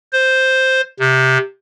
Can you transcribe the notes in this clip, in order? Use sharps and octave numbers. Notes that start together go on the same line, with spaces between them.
C5
C3